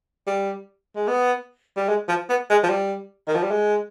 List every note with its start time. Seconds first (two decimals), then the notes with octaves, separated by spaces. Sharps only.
0.27 G3
0.95 G#3
1.08 B3
1.77 G3
1.89 G#3
2.08 F3
2.29 B3
2.50 G#3
2.63 F3
2.70 G3
3.27 D#3
3.35 F3
3.43 G3
3.51 G#3